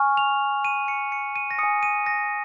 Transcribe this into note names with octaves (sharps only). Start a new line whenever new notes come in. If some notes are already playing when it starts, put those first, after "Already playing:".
Already playing: G#5 C#6 F6
F7
D#7
C#7
C#7
D#7
A#6
G#5 D#6 C#7
D#7
A#6